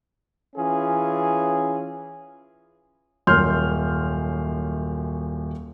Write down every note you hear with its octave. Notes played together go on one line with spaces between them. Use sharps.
E3 C#4 F4 G#4
D#1 F#2 C6 F6 G6